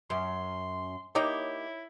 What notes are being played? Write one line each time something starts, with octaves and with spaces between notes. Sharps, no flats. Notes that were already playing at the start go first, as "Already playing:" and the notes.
F#2 C6
A#3 D#4 E4 G4 C#5